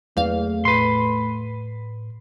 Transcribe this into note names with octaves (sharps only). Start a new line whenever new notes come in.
E2 F#3 A3 A#3 C4 F5
A2 B4 C6